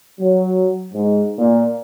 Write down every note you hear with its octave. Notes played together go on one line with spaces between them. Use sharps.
F#3
G#2
A#2